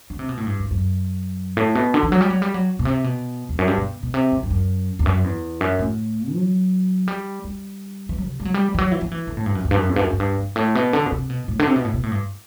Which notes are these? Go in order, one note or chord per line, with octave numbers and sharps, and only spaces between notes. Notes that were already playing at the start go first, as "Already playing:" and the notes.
D3
C3
B2
A2
G2
F#2
F#2
A2
B2
D3
E3
F#3
G3
F#3
G3
F#3
B2
C3
B2
E2
F#2
G2
B2
B2
C3
F#2
G2
F#2
E2
F#2
E2
F#2
A2
F#3
G3
G3
E3
F#3
C3
G3
F#3
G3
E3
F#3
E3
F#3
E3
D3
A2
G2
F#2
E2
G2
F#2
E2
G2
F#2
F#2
G2
G2
A2
B2
D3
B2
C3
B2
A2
D3
C3
B2
A2
B2
A2
G2